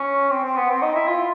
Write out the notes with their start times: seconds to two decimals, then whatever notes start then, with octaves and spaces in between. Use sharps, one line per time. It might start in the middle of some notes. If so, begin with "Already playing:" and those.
Already playing: C#4
0.30 C4
0.43 C4
0.56 B3
0.69 C4
0.82 D#4
0.95 E4
1.07 F4